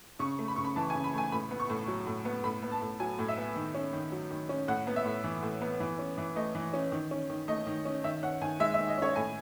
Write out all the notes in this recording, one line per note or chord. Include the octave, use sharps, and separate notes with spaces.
C#3 C#6
A3
B5
C#3 C#6
B5
E3 A5
G#5
C#3
B5
A3 G#5
A2 B5
B3
C#6
A2
F#3
A2
B3
A2 B5
B3
A5
A2
F#3 G#5
A2
E5
B3
D#3
C#4
D#3
F#3
D#3
C#4
A2 F#5
B3
E5
A2
E3
A2
B3
E3
C#4
E3
A3 D#5
E3
C#4
D#3
C#4
D#3
A3 D#5
D#3
C#4
D#3 E5
C#4 F#5
D#3 G#5
G#3 E5
E5
D#3
D#5
C#4 C#5
A2 G#5